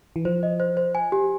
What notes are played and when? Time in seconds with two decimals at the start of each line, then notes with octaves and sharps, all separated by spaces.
0.16 E3
0.25 F3 C5
0.43 D#5
0.60 C5
0.77 C5
0.95 G#5
1.12 G4